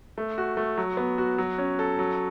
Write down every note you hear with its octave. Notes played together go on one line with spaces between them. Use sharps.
A3
F#4
A3
F#3
B3
F#4
F#3
C#4
A4
F#3